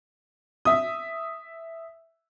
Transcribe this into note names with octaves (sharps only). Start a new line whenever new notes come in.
E5 D#6